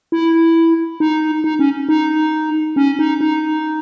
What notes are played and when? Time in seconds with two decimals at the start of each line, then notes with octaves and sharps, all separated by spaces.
0.12 E4
1.00 D#4
1.44 D#4
1.59 C#4
1.89 D#4
2.76 C#4
2.99 D#4
3.21 D#4